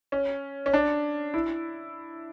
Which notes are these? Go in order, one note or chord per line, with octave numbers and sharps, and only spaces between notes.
C#4
C#4
D4
E4